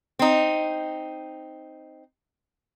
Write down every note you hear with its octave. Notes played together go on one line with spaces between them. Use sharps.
C4 D#4